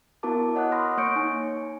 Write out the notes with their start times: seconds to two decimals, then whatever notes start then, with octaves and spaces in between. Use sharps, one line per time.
0.23 B3 E4 F#4 A#4 A5 D6
0.55 C#5 D#5 F#5 D6 D#6 F#6
0.72 B5 C6 D#6 F6 F#6 A#6
0.98 A#3 C#5 C#6 G6 C#7 D7
1.16 D#4 G#5